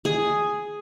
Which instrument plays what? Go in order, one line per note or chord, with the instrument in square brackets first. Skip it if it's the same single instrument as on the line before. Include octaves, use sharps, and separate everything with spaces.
[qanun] G#4